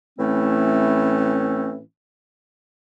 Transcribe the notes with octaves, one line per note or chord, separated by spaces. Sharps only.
A2 E3 A3 C4 C#4